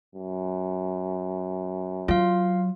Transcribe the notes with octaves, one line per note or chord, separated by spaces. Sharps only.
F#2
F#3 F4 F5